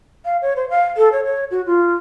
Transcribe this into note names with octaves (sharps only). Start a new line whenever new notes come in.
F5
C#5
C5
F5
A4
C#5
C#5
F#4
F4